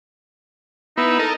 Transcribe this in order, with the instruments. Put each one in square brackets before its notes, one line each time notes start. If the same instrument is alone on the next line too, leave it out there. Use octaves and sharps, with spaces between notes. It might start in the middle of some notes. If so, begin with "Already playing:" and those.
[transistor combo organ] B3 E4 [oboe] D#4
[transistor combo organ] A4 A#4 D#5